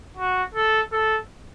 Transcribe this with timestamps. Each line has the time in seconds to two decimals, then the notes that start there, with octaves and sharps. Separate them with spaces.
0.17 F#4
0.54 A4
0.92 A4